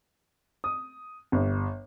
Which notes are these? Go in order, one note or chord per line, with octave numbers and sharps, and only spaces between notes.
D#6
G1